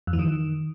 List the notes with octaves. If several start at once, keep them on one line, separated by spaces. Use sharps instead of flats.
F2
E3
D#3